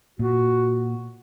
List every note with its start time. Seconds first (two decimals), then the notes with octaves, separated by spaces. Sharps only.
0.19 A#2 F#4